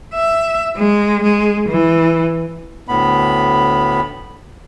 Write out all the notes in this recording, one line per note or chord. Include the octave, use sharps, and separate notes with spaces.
E5
G#3
G#3
E3
D2 A2 B3 B5